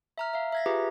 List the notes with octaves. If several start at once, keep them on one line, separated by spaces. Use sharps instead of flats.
E5 A#5 F6
E5 F5
E5 G#6 A#6
F4 G4 G#4 B4 A#5